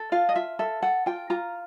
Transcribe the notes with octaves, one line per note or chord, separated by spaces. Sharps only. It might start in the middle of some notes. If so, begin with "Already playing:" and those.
Already playing: A4
F4 F5
D#5
F4 E5
A4 E5
A4 F#5
F4 G5
F4 A#5